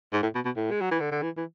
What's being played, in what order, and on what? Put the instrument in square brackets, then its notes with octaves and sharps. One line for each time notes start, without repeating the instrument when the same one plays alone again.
[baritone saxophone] G#2
A2
B2
B2
A2
G#3
F#3
E3
D3
D3
E3
E3